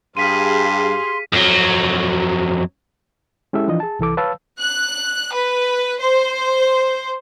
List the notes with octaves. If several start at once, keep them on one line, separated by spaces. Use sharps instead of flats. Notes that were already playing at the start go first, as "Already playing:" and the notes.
G2 G4 G#4 F5 C6 B6 D#7
F2 F#3
G#3 C#4 E4 G4 A4 E5
E3 F3 D4 F4 D#5
G#4 A5
C2 E3 A4 D6
B4 C#5 F5 A5 E6
F#6
B4
C5